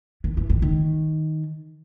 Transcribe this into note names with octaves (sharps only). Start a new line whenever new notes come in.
D#3
E3
D#3
D#3